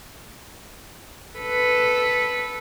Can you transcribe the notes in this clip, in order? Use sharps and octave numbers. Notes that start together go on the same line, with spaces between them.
A4 B4